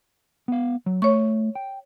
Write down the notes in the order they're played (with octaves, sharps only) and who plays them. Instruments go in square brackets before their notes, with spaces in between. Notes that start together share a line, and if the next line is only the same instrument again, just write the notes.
[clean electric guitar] B3 F5
F#3
[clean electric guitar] A3 [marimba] C#5 C#6
[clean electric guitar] G5